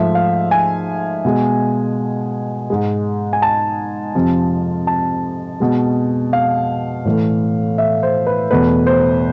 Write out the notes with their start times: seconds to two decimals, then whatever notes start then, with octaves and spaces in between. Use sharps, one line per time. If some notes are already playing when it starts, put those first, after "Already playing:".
Already playing: G#2 F3 A3 E5
0.15 F5
0.51 G#5
1.25 B2 G#3
2.70 G#2 G#3
3.33 G#5
3.42 A5
4.15 F2 C3 F3
4.87 A5
5.60 B2 G#3
6.33 F5
7.05 A2 E3 A3
7.78 E5
8.03 C5
8.27 B4
8.51 E2 B2 A3 B4
8.87 C5